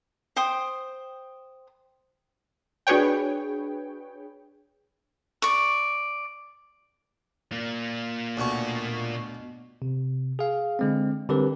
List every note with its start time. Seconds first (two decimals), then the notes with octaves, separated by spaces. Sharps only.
0.36 C5 G5 D#6
2.87 D4 F#4 G#4 B4 C#5 G5
5.42 D5 C#6
7.52 A#2 A#3
8.37 D2 B2 C#6
9.82 C3
10.39 G#4 F5
10.79 D3 G#3 C4
11.29 D3 G3 C4 G4 A#4 B4